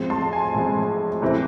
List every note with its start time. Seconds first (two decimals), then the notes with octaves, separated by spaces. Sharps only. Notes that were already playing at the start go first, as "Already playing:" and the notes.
Already playing: A2 F3 G#3 C4
0.10 A5 C6
0.33 G#5
0.54 A2 F3 G#3 C4
1.22 C3 E3 A3 C4 E4